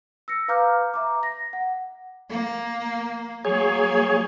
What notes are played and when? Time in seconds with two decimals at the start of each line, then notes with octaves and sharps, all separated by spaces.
0.28 E6 A#6 C#7
0.48 B4 F5 A#5 D6 F6 G6
0.94 E5 A#5 D6
1.23 A#6
1.53 F#5
2.30 A#3
3.45 F#3 A#3 G#4 C#5